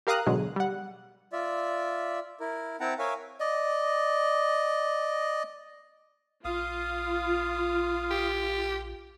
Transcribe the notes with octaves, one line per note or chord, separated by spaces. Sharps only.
G4 A#4 F5 A#5 D#6 F#6
A1 B2 D3 F#3 G#3
G3 F#5
F4 D5 E5
E4 A#4
C4 E4 F#5 G5 A5 A#5
A#4 C#5 E5 F5 G#5
D5 D#5
A#1 F4 F5 D#6
G4